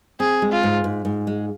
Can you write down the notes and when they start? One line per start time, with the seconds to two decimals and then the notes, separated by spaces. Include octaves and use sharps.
0.20 C4 G#4
0.42 G#3
0.52 F4
0.63 G#2
0.84 G#2
1.05 G#2
1.27 G#3